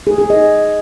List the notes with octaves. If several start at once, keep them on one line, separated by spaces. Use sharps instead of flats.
G#4
G#4
D#5